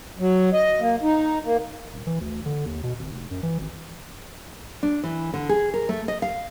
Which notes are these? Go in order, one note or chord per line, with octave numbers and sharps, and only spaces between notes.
F#3
D#5
A#3
D#4
A#3
D#1
E3
D2
D3
D#2
B2
G#1
F1
F#2
E3
G#1
D4
E3
D3
G#4
A#4
A3
D#5
F5